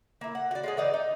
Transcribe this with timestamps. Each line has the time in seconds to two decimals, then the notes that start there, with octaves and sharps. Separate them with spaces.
0.21 A#3 E4
0.35 F#5
0.51 F#4 D5
0.64 G#3 C#4 G#4
0.77 E3 D#4 D5
0.94 D#4